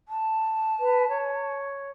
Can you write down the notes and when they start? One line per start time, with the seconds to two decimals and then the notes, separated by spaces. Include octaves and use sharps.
0.08 A5
0.80 B4
1.09 C#5